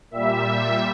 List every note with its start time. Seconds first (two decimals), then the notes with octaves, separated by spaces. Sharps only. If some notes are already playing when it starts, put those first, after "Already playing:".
0.11 A#2 G3 E5